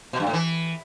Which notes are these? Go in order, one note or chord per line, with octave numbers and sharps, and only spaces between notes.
B2
G2
A2
E3